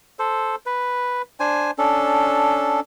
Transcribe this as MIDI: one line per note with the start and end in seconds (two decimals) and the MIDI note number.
0.19 0.56 69
0.19 0.56 72
0.66 1.22 71
1.40 1.71 62
1.40 1.71 72
1.40 1.71 80
1.78 2.80 61
1.78 2.80 62
1.78 2.80 69